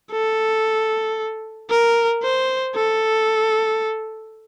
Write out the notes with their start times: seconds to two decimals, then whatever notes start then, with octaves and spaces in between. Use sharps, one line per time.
0.12 A4
1.70 A#4
2.23 C5
2.75 A4